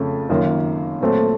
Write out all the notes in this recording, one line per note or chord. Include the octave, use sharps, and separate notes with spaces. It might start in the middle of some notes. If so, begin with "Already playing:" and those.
Already playing: F2 C#3 A3
F#2 D#3 A#3 F4
A#2 F#3 A3 C4